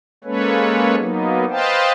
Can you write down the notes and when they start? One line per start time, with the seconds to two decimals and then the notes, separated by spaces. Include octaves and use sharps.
0.24 G#3 A#3 C#4 A4 B4 C#5
0.96 F#3 A#3 B3 D#4
1.50 B4 C5 D#5 F5 G5 A5